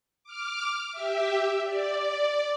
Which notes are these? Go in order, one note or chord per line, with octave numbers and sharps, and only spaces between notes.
D6 F6
G4 E5
D5